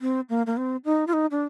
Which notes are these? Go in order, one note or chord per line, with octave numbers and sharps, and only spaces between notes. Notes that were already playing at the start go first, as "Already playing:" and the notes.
C4
A#3
A#3
C4
D#4
F4
D#4
D4